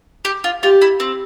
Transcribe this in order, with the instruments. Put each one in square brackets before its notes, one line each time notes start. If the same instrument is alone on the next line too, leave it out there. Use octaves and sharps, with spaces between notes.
[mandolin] G4
F4
[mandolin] F4 [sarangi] G4
[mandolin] E4
C4